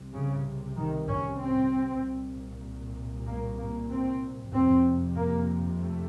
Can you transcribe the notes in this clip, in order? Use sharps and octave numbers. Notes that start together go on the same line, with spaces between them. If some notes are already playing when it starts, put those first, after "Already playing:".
Already playing: C2 C3
C#3
D#3
C#4
C4
C2 A#2
A#3
A#3
C4
F2 C3 C4
A#3
A3